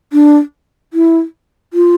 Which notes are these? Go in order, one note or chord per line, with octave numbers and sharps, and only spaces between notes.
D4
E4
F4